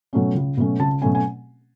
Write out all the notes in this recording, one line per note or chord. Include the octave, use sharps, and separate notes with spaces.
B2 F#3 A3 C#4
C#2
B2 F#3 A3 C#4
C#2 A5
B2 F#3 A3 C#4 G#5
G#5